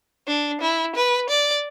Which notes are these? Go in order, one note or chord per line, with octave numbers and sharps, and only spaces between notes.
D4
E4
B4
D5